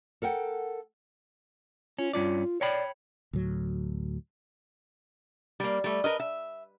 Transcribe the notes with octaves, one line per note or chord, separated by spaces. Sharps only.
A4 A#4 F#5 G5
C#4 F4
G2 C#4 F4 D5
C#5 D5 G5 B5
D2 A2 F#3
G3 A#3
G3 A3
A#4 B4 D#5
E5